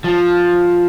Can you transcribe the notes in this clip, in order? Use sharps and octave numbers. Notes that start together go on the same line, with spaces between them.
F3